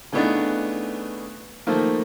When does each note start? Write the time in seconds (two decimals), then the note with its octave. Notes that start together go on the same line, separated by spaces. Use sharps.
0.12 C#3 E3 A3 B3 D4 D#4
1.67 D#3 F3 A3 A#3